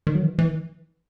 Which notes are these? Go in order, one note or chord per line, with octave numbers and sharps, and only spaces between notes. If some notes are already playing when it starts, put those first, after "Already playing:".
D#3
F#3
E3
E3